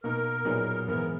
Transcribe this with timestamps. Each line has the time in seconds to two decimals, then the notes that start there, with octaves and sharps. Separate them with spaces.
0.04 B2 A#3 D#4 A#4
0.45 A#2 F#3 B3 D#4 G#4
0.88 G#2 E3 B3 A#4